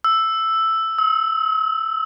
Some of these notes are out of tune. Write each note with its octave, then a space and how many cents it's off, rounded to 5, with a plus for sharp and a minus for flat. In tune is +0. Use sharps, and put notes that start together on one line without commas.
E6 +5
E6 -45